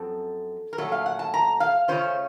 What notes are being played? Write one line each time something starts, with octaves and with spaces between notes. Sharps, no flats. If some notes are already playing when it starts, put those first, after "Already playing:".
Already playing: F#2 F3 C4 A4
A#4
A#2 F#3 A3 A4
F5
F#5
A5
A#5
F5
C#3 A3 C#4 F4 C5